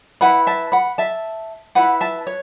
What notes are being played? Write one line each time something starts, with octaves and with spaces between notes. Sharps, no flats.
E4 B4 F#5 B5
E5 A5
F#5 B5
E5 A5
E4 B4 F#5 B5
E5 A5
C#5